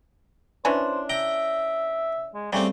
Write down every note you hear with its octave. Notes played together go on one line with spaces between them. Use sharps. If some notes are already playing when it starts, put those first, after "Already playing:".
E3 C#4 D4 C5
E5 G5 A#5
G#3
C#3 G3 A3 C4 G4